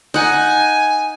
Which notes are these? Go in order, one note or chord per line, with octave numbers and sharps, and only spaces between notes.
D#4 F#5 G#5